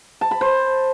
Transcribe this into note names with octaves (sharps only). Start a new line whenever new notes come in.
A5
B5
C5